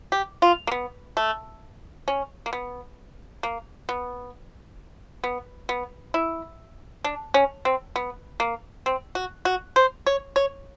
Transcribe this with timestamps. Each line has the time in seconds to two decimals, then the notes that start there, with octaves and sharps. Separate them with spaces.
0.12 G4
0.42 F4
0.67 A#3
0.72 B3
1.17 A3
2.08 C#4
2.46 A#3
2.53 B3
3.43 A#3
3.89 B3
5.24 B3
5.69 B3
6.14 E4
7.04 D4
7.34 C#4
7.65 C4
7.96 B3
8.40 A#3
8.86 C4
9.15 F#4
9.45 F#4
9.76 C5
10.06 C#5
10.36 C#5